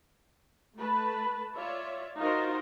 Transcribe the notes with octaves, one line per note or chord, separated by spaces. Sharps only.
A3 B4 A5
F4 C#5 D5 E5
D#4 F4 F#4 A#4 C5